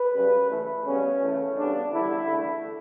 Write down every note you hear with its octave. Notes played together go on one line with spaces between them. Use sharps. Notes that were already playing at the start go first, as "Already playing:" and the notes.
Already playing: B4
F#2 C#3 G3
A2 E3 A3
C#3 G3 B3 C#4
C#3 E3 A3
C#3 G3 B3 D4
E2 D3 G3 E4
E2 D3 A3